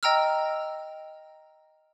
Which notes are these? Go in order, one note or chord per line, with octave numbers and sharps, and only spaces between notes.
D#5 G5 A#5 E6 F6